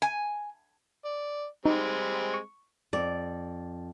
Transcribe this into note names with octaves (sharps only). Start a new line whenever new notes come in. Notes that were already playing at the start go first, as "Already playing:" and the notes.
G#5
D5
G3 G#3 C4 D#4
C#6
F2 D5